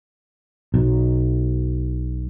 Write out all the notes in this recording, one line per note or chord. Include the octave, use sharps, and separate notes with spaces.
B1